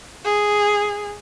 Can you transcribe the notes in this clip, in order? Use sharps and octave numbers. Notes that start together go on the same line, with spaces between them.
G#4